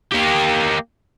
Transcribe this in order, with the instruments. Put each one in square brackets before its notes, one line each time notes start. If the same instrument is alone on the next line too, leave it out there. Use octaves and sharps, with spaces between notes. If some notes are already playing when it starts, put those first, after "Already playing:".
[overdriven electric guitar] A#3 G4